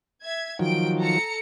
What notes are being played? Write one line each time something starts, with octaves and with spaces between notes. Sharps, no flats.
E5 G#6
D#3 F3 F#3 G5 D7
A4 A#5 C#7